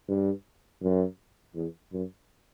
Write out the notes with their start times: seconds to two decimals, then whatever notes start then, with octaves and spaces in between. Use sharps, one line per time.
0.09 G2
0.82 F#2
1.55 E2
1.92 F#2